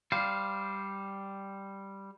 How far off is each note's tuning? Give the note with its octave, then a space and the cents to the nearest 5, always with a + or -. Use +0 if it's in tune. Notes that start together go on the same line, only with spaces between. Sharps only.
G3 +0 C5 -10 F5 +0